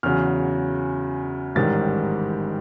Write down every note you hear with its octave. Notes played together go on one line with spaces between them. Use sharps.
E2 C#3 F#3 F6
A1 G#2 D#3 G3 A6